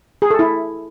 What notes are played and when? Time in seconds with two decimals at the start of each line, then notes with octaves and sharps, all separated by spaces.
0.22 G#4
0.31 A4
0.39 E4